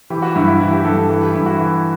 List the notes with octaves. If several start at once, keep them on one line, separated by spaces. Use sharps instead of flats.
E3 G4
F#4
G2 E4
E4
E3 E4
G4
G2 A4
A4
E3 A4
G4
G2 E4
F#4
E3